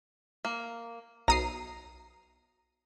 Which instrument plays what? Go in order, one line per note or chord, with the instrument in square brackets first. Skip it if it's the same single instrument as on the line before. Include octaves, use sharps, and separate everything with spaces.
[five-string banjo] A#3
[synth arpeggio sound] B1 D#6 C7 [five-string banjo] A#5